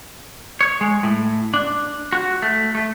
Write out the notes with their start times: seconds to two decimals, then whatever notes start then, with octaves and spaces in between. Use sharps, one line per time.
0.61 C#5
0.81 G#3
1.03 A2
1.54 D4
2.13 F#4
2.42 A3
2.75 A3